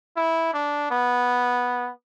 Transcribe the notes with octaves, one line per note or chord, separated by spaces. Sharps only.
E4
D4
B3